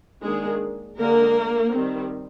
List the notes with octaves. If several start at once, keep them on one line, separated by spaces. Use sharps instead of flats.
D#3 G#3 A#3 D4 G#4
D3 G#3 A#3 D4 A#4
D#3 G3 C4